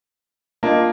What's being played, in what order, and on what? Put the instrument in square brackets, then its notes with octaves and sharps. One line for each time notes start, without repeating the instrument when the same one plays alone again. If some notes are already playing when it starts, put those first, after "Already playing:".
[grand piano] A#3 [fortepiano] D4 F4 D#5